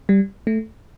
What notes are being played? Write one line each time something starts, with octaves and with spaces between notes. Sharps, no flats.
G3
A3